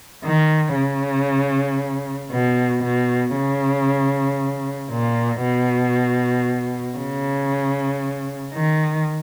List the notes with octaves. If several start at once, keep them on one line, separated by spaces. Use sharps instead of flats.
D#3
C#3
B2
B2
C#3
A#2
B2
C#3
D#3